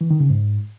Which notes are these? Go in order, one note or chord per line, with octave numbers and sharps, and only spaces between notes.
E3
D#3
C#3
G#2